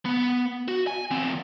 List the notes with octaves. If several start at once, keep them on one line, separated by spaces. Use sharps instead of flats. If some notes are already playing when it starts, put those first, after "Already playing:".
B3
F#4
G#5
E2 C4